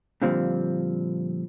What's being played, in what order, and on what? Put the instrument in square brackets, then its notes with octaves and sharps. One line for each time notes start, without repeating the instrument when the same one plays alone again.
[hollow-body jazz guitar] A#2 D3 F3 G3 C4